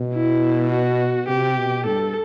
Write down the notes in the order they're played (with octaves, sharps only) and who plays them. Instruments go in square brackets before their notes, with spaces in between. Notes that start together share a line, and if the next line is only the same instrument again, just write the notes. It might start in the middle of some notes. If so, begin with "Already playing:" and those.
Already playing: [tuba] B2
[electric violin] E4
F#4
[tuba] C3 [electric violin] G4
[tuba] B2
[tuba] G2 [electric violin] A4